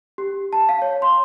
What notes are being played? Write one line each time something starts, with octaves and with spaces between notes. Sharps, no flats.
G4
A5
F5
C#5
C6